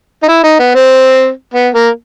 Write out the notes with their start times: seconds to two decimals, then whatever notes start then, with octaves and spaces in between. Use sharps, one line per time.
0.23 D#4
0.28 E4
0.43 D#4
0.59 B3
0.75 C4
1.54 B3
1.74 A#3